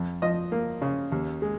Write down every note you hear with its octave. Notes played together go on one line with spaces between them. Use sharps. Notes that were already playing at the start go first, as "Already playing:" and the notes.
Already playing: F2
F3 D#5
A#3
C#3
D#2
G#3